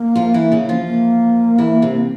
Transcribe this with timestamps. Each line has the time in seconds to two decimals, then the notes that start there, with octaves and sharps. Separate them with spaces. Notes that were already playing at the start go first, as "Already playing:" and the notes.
Already playing: A#3
0.15 F3 F4
0.34 E3 E4
0.52 C#3 C#4
0.69 F3 F4
0.87 A#3
1.58 E3 E4
1.82 C3 C4